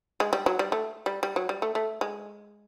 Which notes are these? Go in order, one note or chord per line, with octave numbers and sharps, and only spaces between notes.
G#3
G3
F#3
G3
A3
G3
G3
F#3
G3
A3
A3
G#3